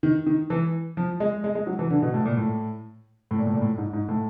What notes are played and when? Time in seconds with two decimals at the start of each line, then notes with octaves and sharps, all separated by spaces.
0.03 D#3
0.26 D#3
0.50 E3
0.97 F3
1.20 G#3
1.44 G#3
1.55 G#3
1.67 F#3
1.79 E3
1.90 D3
2.02 B2
2.14 A2
2.25 A#2
2.37 A2
3.31 A2
3.39 A#2
3.47 A2
3.54 A#2
3.62 A2
3.78 G#2
3.93 G#2
4.09 A2